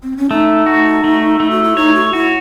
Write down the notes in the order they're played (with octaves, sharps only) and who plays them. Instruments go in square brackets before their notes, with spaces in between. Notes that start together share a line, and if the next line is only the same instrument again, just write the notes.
[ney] C4
C#4
[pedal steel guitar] A3 [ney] D#4
[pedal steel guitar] F#4
A3
A3
[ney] F#4
E4
[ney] D#4 [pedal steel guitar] C#5
[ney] F#4
[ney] E4 [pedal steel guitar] F#4